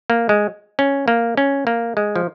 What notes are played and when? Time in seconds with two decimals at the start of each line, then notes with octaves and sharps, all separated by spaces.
0.10 A#3
0.29 G#3
0.79 C#4
1.08 A#3
1.37 C#4
1.67 A#3
1.97 G#3
2.16 F3